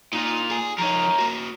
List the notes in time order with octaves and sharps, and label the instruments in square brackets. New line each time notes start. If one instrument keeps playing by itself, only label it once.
[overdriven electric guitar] A#2 F4 [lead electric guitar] D#4
[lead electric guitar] G#4 G#5
[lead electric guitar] F3 D#4 [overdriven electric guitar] A#4 C#5
[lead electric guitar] A#3 F#4